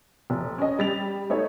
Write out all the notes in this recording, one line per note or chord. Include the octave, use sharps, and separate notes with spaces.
F1
C#4 D#5
G3 A6 F7
A3 D#4 C#5